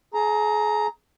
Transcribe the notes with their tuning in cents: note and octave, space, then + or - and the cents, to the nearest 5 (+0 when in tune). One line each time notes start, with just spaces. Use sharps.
G#4 +35 A#5 +0